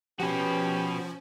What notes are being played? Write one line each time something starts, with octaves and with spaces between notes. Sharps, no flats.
F3 C#4 F#4 G4 B4